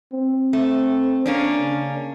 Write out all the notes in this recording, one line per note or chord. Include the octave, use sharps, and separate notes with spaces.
C4
A3
A#3 C#4 D4
C#3